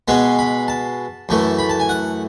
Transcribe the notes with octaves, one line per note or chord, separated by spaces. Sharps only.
B2 G#3 B3 G#5
B5
A5
F#2 E3 A3
B5
A5
G#5
F#5